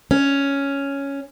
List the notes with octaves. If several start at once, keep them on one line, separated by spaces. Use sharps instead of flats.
C#4